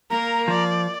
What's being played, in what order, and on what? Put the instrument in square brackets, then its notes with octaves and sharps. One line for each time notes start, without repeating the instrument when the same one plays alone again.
[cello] A#3 [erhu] A#4 [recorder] A#5
[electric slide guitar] F3 [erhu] D5